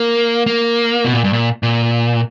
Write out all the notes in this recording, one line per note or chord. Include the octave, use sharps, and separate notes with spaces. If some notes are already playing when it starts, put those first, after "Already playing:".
Already playing: A#3
A#3
B2
A#2
G2
A#2
A#2